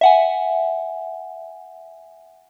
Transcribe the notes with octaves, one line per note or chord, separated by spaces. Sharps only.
E5 F#5 G#5